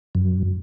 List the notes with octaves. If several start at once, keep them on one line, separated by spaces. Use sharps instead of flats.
F#2